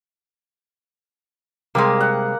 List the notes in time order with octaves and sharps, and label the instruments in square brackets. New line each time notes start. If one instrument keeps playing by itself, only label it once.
[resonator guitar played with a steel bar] C3 G3 G#3 [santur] A#3
[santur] F#5